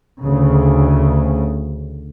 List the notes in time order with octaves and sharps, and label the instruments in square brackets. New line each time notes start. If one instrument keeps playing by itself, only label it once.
[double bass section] D2 C#3